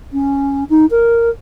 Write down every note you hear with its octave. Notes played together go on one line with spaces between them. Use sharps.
C#4
D#4
A#4